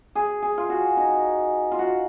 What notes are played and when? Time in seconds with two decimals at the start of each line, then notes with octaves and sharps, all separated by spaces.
0.15 G#4
0.42 G#4
0.58 F4
0.70 F#4
0.97 D#4
1.71 F4
1.79 F#4